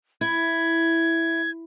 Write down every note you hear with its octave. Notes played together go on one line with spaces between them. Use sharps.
E4 G#6